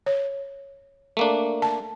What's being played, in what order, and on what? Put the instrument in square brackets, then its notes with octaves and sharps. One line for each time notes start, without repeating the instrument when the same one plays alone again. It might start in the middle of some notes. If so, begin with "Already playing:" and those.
[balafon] C#5
[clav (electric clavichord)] A3 A#3 D4
[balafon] A5